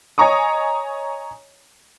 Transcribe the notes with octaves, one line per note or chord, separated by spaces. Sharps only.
C#5 D#5 G#5 A#5 C#6 D#6